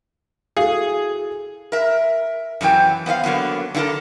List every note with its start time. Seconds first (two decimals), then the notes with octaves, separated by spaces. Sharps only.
0.57 E4 F#4 G#4 A4 F5
1.72 A#4 E5
2.61 F#2 C3 E3 F#3 G4 G5
3.06 B3 C5 E5 F5
3.23 D3 F#3 A#3 B3
3.75 D3 D#4 E4 A4 A#4